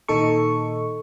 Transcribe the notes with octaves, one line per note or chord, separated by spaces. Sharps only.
A#2 D#3 D#4 A4 C#6